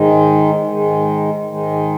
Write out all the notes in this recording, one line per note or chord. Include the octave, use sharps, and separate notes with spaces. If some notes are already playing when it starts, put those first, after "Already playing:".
Already playing: G#2 D#3 G#3
G#2 D#3 G#3
G#2 D#3 G#3